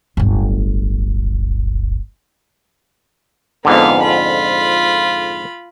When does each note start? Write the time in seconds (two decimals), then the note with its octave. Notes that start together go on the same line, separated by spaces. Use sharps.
0.17 D1 G1
3.65 F2 G#2 D3 B3 F5
4.02 F4 B5